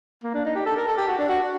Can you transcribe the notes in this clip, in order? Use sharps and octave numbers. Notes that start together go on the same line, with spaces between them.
A#3
D4
D#4
G4
A4
A#4
A4
G4
F#4
D4
F#4